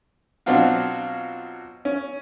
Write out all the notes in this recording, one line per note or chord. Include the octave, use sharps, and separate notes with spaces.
B2 F#3 C4 D4 F4 F#4
C#4